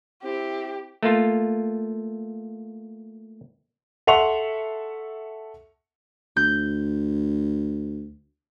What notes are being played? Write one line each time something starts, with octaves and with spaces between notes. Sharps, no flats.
C4 E4 G4
A3 A#3 F4
A4 E5 F#5 C6 C#6 F7
D2 G6